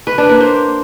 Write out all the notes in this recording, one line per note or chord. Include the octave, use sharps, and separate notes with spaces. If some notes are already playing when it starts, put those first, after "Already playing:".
B4
D4
A#3
C5